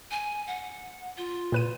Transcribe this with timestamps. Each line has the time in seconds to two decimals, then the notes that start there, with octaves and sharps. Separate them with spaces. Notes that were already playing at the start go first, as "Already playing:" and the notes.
0.11 G#5
0.47 F#5
1.18 F4
1.52 A#2 B4 D#7